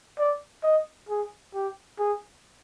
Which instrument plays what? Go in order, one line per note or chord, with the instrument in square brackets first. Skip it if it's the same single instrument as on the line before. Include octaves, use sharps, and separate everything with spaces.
[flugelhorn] D5
D#5
G#4
G4
G#4